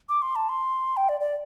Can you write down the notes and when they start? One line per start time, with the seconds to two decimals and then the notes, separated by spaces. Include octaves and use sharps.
0.09 D6
0.22 C6
0.36 A5
0.49 C6
0.97 G5
1.09 D5
1.20 D5